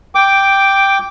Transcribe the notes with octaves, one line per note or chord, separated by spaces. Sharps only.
G5 D6